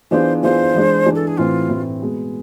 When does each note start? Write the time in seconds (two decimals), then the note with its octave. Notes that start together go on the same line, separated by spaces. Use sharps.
0.11 E3 B3 D4 F4 G#4 C5
0.43 E3 B3 D4 F4 G#4 C5
0.74 E3 G#3 D4
1.06 E3 G#3 D4
1.15 A4
1.27 G#4
1.37 A2 E3 A3 C4 F4
1.69 A2 E3 A3 C4
2.01 B2 G#3 B3